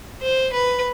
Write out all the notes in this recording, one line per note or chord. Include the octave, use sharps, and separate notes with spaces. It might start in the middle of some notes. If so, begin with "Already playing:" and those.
C5
B4